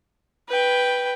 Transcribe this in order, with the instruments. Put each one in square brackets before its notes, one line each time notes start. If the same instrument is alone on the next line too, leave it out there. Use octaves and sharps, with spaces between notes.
[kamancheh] B4 G5